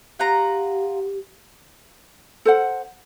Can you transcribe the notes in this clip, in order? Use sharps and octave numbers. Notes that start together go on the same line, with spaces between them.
F4 G4 F#5 A#5
A4 C5 F#5